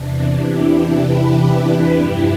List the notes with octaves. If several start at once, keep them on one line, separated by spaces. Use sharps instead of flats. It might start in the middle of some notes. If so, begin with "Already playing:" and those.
Already playing: E2 C3 E3 D4
E4 G4
G4 B4
G4 B4
G2 F3 E4 G4